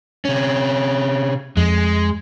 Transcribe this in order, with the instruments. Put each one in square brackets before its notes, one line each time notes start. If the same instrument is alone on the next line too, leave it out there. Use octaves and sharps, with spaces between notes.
[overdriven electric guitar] C3 C#4
[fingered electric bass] F2 [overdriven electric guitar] G#3